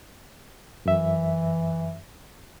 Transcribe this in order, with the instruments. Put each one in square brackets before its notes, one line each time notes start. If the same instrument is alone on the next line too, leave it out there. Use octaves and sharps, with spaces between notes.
[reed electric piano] F#2 E5 [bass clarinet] E3